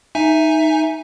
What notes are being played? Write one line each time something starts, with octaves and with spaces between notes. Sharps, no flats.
D#4 E5 G#5